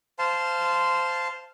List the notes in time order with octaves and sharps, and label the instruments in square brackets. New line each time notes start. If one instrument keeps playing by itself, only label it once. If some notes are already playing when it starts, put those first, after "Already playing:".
[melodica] C5 F5 A5 C6